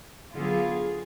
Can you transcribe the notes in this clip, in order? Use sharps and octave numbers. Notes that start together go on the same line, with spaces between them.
D3 F#3 B3 F4 G#4